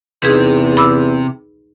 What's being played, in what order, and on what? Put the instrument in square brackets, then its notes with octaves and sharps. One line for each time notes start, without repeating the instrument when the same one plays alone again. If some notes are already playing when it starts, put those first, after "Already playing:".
[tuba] E2 [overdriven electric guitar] C3 [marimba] D#4 G#4 B4
[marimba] B5 D6 E6